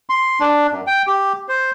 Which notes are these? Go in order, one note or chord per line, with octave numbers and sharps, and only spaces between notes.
C6
D4
F#2
G5
G4
C5